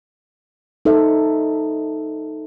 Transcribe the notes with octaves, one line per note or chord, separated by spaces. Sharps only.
D#4 A4 C5 E5